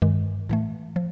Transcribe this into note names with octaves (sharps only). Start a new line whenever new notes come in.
G2 D#3 G#3
A2 E3 A3
F3